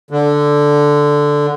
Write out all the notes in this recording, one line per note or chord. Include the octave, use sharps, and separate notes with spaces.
D3